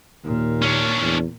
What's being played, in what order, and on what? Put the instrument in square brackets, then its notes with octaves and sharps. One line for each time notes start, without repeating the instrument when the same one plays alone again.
[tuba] D#2 [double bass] A#2
[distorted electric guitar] C#4 D4
[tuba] E2